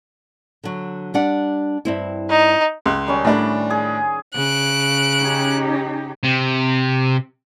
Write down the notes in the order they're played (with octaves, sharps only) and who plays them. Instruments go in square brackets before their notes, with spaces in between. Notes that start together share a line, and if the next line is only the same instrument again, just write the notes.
[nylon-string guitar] D3 F#3
G3 D4 F#5
G2 C4 E4
[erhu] D#4
[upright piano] C#2 F#6 [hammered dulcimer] C6
[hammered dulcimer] D#3 G3 C#4
[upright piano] A2 D4
[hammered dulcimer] G#4
[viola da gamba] C#3 [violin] F#6 D7
[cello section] C#4 D#4 G4
[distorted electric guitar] C3